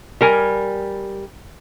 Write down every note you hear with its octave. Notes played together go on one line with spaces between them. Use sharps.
G3 A#4 G#5